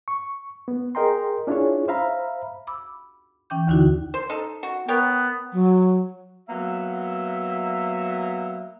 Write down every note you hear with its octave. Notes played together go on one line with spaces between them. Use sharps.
C#6
B3
G#4 A#4 D#5 G5 A#5 C6
C#4 D4 E4 F4 G#4 C#5
C5 E5 F5 A#5 B5
B5 D6 E6
E3 C#4 G5 D6 G6
D#2 D3 D#4 E4 F#4
C5
D#4 A4
F#4
B3 A#4 C#5 G5
F#3
F#3 A#3 B3 E5